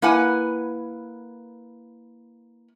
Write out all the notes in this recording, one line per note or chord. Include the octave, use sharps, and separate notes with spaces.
A#3 E4 B4 F#5 G#5